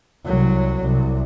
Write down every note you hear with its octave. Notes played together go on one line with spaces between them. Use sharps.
C2 F#3
C2